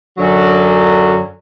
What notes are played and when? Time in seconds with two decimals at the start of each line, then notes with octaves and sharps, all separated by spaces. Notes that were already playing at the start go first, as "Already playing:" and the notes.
0.17 F#2 D3 F#3